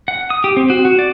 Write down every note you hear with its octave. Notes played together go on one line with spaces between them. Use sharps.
F#5
D#6
G4
C4
F#4
F#4
D5